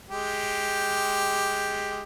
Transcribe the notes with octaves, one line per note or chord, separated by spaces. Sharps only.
G#3 G4